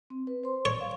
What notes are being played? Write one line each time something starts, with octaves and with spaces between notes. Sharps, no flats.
C4
B4
C5 C6
C#5 D5
F5